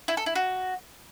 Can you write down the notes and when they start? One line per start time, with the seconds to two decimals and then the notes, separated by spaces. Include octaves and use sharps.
0.08 E4
0.17 A4
0.26 E4
0.35 F#4